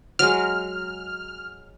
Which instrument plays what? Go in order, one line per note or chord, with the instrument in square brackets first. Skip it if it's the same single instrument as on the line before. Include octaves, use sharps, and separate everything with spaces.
[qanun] F#3 G#3 [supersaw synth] F6